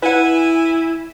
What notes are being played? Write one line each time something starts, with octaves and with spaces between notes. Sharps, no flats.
E4 B4 F#5 G#5